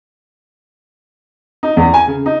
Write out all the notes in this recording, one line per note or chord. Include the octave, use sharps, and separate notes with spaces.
D#4
E2
G#5
C#3
D#4